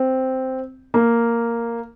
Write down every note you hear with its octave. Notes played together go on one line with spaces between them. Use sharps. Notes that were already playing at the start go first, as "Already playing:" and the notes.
Already playing: C4
A#3